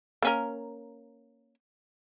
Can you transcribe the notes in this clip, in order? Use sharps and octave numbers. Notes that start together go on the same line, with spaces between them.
A#3 C#4 A#4